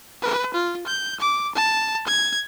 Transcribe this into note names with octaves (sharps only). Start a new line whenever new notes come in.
B4
F4
G6
D6
A5
G#6